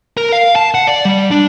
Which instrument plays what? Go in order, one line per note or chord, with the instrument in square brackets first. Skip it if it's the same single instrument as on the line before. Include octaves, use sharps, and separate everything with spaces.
[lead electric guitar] A#4
F5
A5
F#5
D5
G3
D4